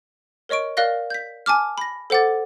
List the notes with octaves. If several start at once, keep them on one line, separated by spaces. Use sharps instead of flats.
A#4 C#5 D#5 C#6 D7
A#4 D5 F5 F#6 A#6 G7
G6 B6
G#5 A5 D6 F6
B5 A#6
A4 C5 F#5 D6 A6